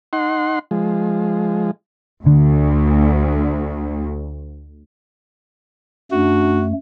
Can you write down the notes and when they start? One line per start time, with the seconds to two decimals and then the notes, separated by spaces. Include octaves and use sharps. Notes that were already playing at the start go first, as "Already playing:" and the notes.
0.13 D#4 F#5 C6
0.71 F3 G#3
2.26 D2 D3
6.12 F#2 A3 D4 F#4